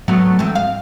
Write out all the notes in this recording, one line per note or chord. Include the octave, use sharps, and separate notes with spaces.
F#3 A3 B3
E3 C4
F5